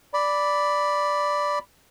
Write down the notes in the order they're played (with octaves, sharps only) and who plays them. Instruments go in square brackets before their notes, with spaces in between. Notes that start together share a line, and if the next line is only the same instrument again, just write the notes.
[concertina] D5 B5